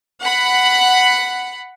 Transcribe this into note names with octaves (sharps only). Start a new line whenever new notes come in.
F#5 B5